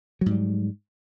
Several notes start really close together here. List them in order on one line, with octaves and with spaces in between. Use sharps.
F#3 G#2 G3